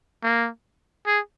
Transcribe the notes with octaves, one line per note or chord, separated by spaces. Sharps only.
A#3
G#4